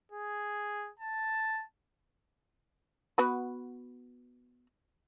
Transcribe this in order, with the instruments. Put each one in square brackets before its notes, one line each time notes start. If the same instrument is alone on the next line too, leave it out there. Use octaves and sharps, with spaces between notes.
[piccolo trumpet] G#4
A5
[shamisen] B3 F#4 B4